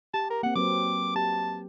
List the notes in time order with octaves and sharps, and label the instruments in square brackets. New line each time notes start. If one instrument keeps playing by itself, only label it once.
[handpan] G4 [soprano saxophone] A5
[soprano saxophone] A#4
[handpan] A#3 C4 [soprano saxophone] F#5
[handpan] F#3 C4 B4 [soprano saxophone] D6
[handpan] G4 [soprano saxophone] A5